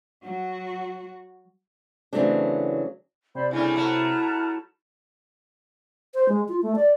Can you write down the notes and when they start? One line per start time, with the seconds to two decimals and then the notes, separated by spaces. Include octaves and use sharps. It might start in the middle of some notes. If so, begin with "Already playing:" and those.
0.24 F#3 F#4
2.13 C#3 E3 F#3 A3 C4 D4
3.35 C3 C5 D5 B5
3.51 C#3 G3 A3 D4 E4 G#5
3.76 F#3 A3 A5 A#5 F6
6.14 C5
6.29 G#3
6.48 F4
6.62 A3
6.75 D5